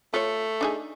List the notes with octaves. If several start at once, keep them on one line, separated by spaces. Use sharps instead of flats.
A3 F4 C#5
D4 D#4 G#4